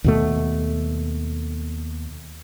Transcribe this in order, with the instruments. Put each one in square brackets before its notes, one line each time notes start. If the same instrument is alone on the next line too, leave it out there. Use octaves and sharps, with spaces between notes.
[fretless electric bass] D#2 B2 A3